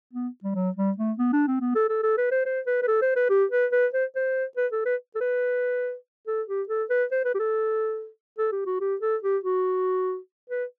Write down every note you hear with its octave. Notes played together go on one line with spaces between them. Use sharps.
B3
G3
F#3
G3
A3
B3
D4
C4
B3
A4
A4
A4
B4
C5
C5
B4
B4
A4
C5
B4
G4
B4
B4
C5
C5
B4
A4
B4
A4
B4
A4
G4
A4
B4
C5
B4
G4
A4
A4
G4
F#4
G4
A4
G4
F#4
B4